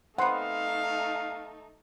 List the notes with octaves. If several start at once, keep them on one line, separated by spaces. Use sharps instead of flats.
A3 B3 C4 D#4 F5 F#5 C6